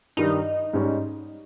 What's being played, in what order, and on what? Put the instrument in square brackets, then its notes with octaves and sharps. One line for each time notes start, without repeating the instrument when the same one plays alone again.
[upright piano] G2 D#3 G3 [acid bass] D#4
[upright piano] G#2 G3 C#4